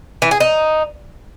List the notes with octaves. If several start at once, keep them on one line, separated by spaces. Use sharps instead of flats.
E3
G#4
D#4